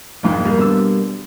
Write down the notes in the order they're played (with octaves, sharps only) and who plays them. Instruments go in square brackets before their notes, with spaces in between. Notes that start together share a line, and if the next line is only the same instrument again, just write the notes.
[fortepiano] A#1 F2 G#2
[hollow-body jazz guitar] G3 A#3
[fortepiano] B2 D3 E6